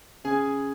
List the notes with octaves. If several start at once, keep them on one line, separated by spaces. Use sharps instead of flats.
C#3 G#4 G#5